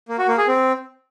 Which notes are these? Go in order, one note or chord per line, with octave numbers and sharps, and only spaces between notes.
A#3
F#4
A#3
G#4
C4